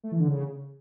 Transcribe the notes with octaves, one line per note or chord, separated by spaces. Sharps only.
A3
E3
D3
C#3